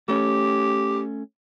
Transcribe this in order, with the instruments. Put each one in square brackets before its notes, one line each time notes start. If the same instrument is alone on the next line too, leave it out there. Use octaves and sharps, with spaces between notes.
[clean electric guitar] A3 C#4 [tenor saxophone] G4